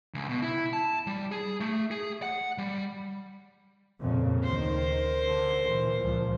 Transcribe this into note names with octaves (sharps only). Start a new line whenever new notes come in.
C#2
B2
E4
A5
G3
G#4
A3
G#4
F#5
G3
F2 A#2 C#3
D2 D#3 A#4 C5
D3
A#2 E3
C#2 A#2 F3